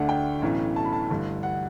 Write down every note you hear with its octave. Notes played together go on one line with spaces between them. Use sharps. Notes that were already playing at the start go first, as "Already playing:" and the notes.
Already playing: D2 D3 A3 D4 F#5
G5
B1 A2 E3 A3 C#4
A5
B5
A5
A1 G2 D3
F#5